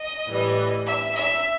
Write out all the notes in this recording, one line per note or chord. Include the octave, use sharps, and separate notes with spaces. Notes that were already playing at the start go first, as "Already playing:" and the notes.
Already playing: D#5
A2 E3 G3
E5
E5